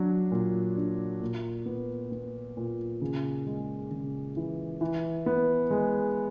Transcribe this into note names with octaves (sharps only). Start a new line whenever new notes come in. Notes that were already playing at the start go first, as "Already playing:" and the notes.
Already playing: F#3 D4
A#2
D4
A#2
B3
B3
A#2
C#3
G#3
C#3
E3
E3
B3
G#3